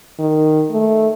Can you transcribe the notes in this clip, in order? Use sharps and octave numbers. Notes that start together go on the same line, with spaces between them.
D#3
A3